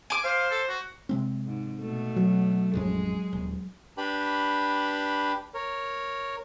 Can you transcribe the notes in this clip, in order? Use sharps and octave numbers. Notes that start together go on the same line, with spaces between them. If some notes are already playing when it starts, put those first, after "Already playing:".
G#5 D6
C5 F5
A4
F#4
C3 G#3 C4
G#2
B2 A3
F#3
D#1 A1 F2 G#3 G#4
D#1
D4 G4 B4 B5
A#4 C#5